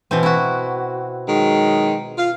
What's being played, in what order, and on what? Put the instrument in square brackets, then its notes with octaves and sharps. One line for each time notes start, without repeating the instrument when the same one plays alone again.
[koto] B2 E3 C4
E4 F#4
[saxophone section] D#3 F#3 G#3
F4 F5